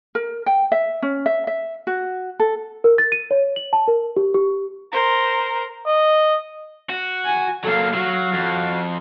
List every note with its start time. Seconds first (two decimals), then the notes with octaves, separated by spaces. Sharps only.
0.15 A#4
0.46 G5
0.72 E5
1.02 C#4
1.26 E5
1.47 E5
1.87 F#4
2.40 A4
2.84 A#4
2.98 A6
3.12 D#7
3.31 C#5
3.56 F#7
3.73 A5
3.88 A#4
4.17 G4
4.34 G4
4.91 A#4 C5
5.87 D#5
6.90 F#4
7.25 G#5
7.64 F#3 A#3 A4 F5
7.94 F#3 F#4 F5
8.33 F2